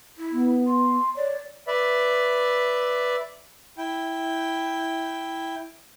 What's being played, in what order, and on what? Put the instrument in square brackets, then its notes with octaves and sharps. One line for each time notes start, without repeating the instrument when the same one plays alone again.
[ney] E4
[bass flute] B3
[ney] C6
[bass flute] C#5 [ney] D5
[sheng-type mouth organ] B4 D5 E5
E4 G5